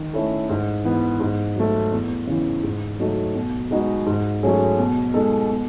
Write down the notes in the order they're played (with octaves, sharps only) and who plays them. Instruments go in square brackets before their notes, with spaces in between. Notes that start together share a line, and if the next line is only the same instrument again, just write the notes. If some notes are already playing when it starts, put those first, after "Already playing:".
Already playing: [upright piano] D#3
A3 C#4 E4 A4
G#2
E3 B3
G#2
F#3 A3
E2
C#3 E3
G#2
F#3 A3 D#4 F#4
B2
G#3 B3 D#4 F#4
G#2
F#3 A3 C#4 G#4
B2
G#3 D#4 A4
B2